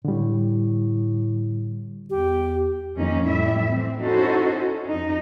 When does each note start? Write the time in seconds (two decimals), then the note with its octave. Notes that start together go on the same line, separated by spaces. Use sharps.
0.05 A2 D3 G3
2.10 E2 G4
2.96 F2 D#3 A#3 C#4 D#4
3.25 F2 A2 G3 E4 E5
3.68 E3 C4
4.02 C#4 D#4 E4 F#4 A4 C5
4.53 C#4
4.88 F2 D#4